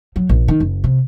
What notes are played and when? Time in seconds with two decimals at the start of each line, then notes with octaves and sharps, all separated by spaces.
0.16 F#3
0.29 A#1
0.48 D#3
0.60 F#1
0.84 C3